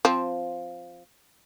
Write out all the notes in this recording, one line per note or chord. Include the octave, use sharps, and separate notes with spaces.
F3 C4